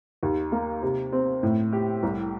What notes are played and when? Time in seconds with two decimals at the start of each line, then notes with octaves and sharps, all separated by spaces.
0.23 D#2
0.52 A#3
0.83 C3
1.13 C4
1.43 A2
1.73 G4
2.03 C2